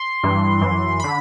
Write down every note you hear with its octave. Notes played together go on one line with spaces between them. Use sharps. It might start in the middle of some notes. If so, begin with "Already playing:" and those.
Already playing: C6
G2 E3
F#2 E3
D3 B5